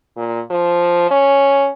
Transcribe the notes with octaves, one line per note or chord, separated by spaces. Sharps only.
A#2
F3
C#4